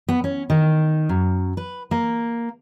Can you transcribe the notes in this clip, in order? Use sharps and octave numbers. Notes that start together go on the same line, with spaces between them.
B3
C#4
D#3
F#2
B4
A#3